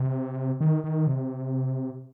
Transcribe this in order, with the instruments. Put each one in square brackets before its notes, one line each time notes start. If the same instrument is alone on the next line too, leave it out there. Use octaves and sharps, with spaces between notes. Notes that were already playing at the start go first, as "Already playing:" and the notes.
Already playing: [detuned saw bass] C3
D#3
D#3
C3